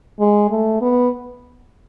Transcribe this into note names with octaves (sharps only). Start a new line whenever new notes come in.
G#3
A3
B3